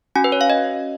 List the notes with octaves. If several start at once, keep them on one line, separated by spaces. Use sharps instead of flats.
C#4 F#4 G#5
B4
C#5
F5
D#5